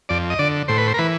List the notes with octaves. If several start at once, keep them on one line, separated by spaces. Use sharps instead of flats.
F2 D5
D#5
D3 D5
A2 C5
B4
C5
A#4
E3 B4